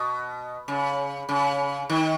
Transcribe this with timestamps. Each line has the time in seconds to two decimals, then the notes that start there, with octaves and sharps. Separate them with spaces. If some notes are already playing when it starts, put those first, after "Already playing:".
Already playing: B2
0.68 C#3
1.29 C#3
1.90 D#3